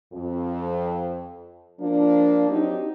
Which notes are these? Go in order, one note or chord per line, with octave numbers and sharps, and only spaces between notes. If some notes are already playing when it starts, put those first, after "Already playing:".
F2
F3 A#3 D4
F#3 C4 D#4 G4